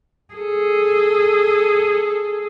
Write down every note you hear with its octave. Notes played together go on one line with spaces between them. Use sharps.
G#4 A4